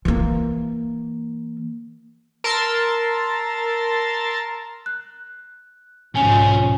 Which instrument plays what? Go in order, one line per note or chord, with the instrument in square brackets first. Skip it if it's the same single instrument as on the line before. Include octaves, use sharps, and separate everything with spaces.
[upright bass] E3 A#3
[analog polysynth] A#4 A5 C6 E6 A6
[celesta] F#6
[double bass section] B1 G#2 F3 [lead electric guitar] C#3 C#4 [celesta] G#5 F7